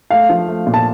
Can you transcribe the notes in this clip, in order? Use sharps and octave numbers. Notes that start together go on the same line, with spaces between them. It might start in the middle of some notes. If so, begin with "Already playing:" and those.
A3 F5
F3
A3
A#2
A5